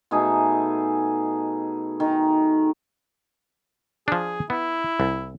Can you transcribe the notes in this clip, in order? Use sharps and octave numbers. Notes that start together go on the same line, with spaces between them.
B2 A3 D#4 G#4
D#3
F3 D4 G#4
B3 E4
C2